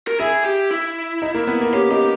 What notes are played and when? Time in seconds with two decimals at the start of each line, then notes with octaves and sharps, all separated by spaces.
0.08 A#4
0.20 E4 G#4
0.45 G4
0.71 E4
1.22 D#4
1.35 A#3
1.47 B3
1.61 A#3
1.73 C#4 G4
1.91 D#4 G4